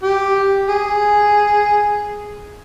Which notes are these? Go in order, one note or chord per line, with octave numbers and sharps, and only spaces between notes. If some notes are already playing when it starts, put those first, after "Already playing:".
G4
G#4